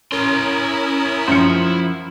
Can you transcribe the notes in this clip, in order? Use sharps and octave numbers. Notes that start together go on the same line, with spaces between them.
C#4 E4 A#4 C6 D#6
F#2 F3 C5 F6 C#7